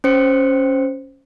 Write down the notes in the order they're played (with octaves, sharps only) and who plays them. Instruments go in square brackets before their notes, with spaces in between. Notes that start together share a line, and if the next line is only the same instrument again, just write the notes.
[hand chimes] C#4 C5 C#7